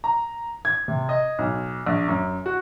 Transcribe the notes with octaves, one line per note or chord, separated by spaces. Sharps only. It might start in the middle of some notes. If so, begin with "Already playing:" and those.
A#5
G#6
C3
D#5
B1
A#1
F#2
F#4